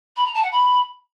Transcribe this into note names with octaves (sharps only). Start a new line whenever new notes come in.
B5
A#5
A5
F#5
B5